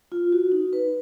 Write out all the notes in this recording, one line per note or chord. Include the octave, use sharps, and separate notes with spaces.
F4
F#4
D#4
B4